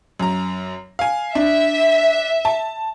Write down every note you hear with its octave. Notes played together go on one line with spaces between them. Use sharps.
F#2 A#5
F5 G#5
D4 E5
A5